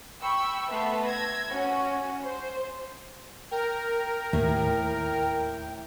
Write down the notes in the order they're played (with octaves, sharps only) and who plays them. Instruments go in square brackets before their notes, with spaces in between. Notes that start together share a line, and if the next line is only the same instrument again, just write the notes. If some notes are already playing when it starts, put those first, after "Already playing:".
[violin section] G5 B5 C#6 E6
A3 B3 B4 E5 A5 C6
E6 G#6 A#6
C#4 F#4
C5
[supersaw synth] A#4 [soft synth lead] G5
[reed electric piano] D#2 [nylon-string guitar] A2